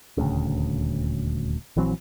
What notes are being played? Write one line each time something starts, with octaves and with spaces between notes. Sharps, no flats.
D#1 D2 C#3
A#1 E3 F#3 C4